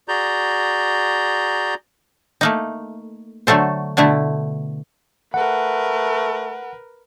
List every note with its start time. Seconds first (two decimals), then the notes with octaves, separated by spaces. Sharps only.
0.08 F#4 G#4 D5 A#5 G6
2.41 A3 A#3 D#4
3.47 D3 F#3 A3 A4 C5
3.97 B2 D3 A3 E4
5.34 A3 A#4 B4 F#5